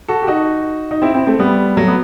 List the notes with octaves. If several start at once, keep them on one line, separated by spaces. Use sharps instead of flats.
F#4 A4
G4
D#4 F#4
D#4
C4 E4
C4 E4
A3 C4
G3 B3
F#3 A3
B3